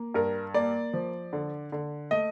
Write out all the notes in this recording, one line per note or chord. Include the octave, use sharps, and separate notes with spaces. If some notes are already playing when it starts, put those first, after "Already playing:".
Already playing: A#3
G2 A#4
A#3 D5
F3
D3
D3
A3 D#5